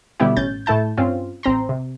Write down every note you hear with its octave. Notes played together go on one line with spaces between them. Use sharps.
B2 D3 G3 B3 E4 G4
A1 C#4 G6 A6
A2 A3 E4 A5 G6
G2 C4 C#4 F4
A1 C4 A#5 C6
C3